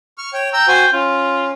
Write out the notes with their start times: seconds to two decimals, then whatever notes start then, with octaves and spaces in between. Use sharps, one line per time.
0.18 C#6 F6
0.33 C#5 G5
0.53 G5 A#5 E6
0.68 F#4 C5 G#5
0.93 C#4 F4